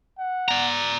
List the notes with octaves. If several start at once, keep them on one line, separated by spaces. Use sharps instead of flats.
F#5
D5 A#5